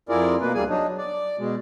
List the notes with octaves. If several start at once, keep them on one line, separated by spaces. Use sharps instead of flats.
F2 E4 F4 G#4 A#4 D5
B2 A#3 B4
D2 G3 A#3 G#4 G#5
F#3 D4 D#4
D5
B2 G#3